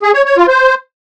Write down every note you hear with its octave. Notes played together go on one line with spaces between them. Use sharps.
G#4
C#5
C#5
F4
C5